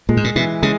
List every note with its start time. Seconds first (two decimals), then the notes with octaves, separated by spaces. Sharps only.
0.09 A#2 G#3
0.17 G#2
0.24 A#2
0.36 B2 E3
0.63 C#3 G#3